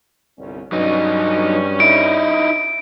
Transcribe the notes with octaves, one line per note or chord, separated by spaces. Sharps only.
G1 C2 C#4
G2 F#3 C#4 D#4
D#4 E4 D7